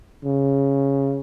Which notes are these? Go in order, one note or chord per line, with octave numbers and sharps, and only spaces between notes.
C#3